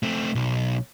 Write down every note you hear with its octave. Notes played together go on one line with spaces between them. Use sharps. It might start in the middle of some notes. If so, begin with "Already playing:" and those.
A3 C4
B1